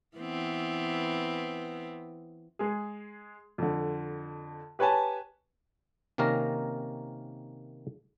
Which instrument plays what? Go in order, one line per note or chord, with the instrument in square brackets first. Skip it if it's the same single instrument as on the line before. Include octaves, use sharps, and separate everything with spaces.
[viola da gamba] E3 B3 C4
[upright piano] G#3 G#4
F2 D3
G4 B4 C#5 G#5 A5
[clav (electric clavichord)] C3 D#3 A#3 C#4 A#4 A#5